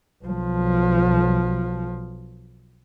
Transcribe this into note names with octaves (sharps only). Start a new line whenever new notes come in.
B1 F3